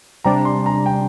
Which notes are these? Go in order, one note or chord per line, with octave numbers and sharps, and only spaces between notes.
C3 G3 D4 A#5
C6
A#5
G5